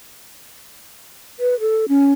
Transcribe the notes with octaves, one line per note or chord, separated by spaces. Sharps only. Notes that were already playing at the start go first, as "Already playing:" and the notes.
B4
A4
C#4